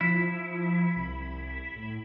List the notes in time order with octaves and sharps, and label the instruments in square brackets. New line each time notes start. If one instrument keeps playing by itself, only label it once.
[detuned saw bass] F3 [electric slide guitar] E4
[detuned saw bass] C2
A2